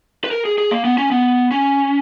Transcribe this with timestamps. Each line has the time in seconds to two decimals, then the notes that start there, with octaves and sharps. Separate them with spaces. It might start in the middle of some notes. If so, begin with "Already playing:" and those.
0.24 B4
0.31 A#4
0.45 G#4
0.58 G#4
0.71 A#3
0.85 B3
0.98 C#4
1.11 B3
1.51 C#4